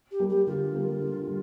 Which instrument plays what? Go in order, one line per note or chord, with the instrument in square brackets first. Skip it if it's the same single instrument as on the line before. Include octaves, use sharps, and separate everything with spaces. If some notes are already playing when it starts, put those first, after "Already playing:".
[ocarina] G4
[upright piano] G3 A#3
[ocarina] G4
[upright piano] D3 [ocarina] F4
[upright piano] G3 A#3
D3
G3